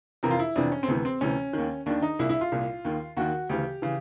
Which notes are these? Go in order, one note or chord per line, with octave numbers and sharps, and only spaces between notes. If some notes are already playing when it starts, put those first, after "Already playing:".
F2 C3 E3 A#4
F4
E4
F2 C3 E3 D4
C#4
C4
D2 C3 E3 B3
C4
D2 C3 E3 C#4
D#2 D#3
D#2 D#3 D4
D#4
C2 A#2 E4
E4
F4
C2 A#2
D#2 D#3
D#2 D#3 F#4
D2 C#3 E3 G4
C#3 E3